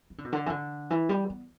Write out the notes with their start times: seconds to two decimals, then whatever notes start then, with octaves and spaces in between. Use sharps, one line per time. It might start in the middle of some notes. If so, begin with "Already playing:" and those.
0.10 E3
0.18 D3
0.25 B2
0.33 D3
0.46 E3
0.50 D3
0.90 E3
1.09 G3
1.30 B3